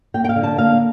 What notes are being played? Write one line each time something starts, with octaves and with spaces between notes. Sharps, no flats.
A#3 G5
G5
F5
D3
A5
A#3 F5